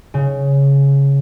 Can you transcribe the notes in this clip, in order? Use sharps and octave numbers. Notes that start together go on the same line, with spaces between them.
C#3